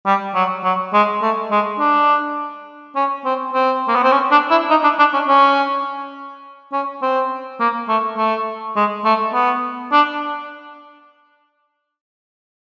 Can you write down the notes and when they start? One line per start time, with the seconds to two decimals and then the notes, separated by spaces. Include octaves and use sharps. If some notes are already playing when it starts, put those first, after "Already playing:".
0.06 G3
0.35 F#3
0.64 F#3
0.93 G#3
1.22 A3
1.51 G#3
1.79 D4
2.96 C#4
3.25 C4
3.53 C4
3.88 A#3
3.95 B3
4.03 C4
4.12 C#4
4.31 D4
4.50 E4
4.70 D#4
4.84 D4
4.99 D4
5.13 C#4
5.28 C#4
6.72 C#4
7.02 C4
7.60 A#3
7.88 A3
8.17 A3
8.76 G#3
9.05 A3
9.33 B3
9.92 D4